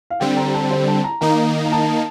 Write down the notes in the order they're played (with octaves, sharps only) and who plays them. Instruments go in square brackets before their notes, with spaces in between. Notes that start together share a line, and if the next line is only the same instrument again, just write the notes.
[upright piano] F5
[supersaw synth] D3 G3 C4 [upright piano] G5
[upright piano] A#5
A5
C5
A5
A#5
[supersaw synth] D#3 A#3 D#4 [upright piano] A#5
[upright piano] A#5
A5